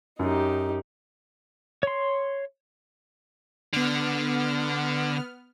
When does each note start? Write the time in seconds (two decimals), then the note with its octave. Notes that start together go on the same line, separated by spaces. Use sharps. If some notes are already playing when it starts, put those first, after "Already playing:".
0.19 F#2 D#4 G4
1.83 C#5 C6
3.73 D3 B3 F6